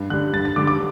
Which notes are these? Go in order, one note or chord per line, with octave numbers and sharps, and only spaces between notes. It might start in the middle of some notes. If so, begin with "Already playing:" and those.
Already playing: G2
D3 G3 F#6
G2 A6
A6
D3 G3 D6
D6